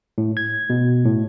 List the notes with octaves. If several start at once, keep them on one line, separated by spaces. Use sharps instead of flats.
A2
G#6
B2
A2